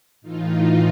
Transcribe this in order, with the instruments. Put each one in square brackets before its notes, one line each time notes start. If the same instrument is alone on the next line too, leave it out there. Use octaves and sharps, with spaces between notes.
[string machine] A2 E3 D#4 F4